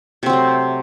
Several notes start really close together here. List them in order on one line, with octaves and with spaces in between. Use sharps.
C3 C4 F#3 A3